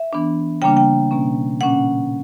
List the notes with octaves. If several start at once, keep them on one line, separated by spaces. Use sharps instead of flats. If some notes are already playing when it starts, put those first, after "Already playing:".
Already playing: E5
E3 B3 D4
C#3 G3 A#3 D4 G5
G5
B2 A#3 C#4
A#2 A#3 C#4 F#5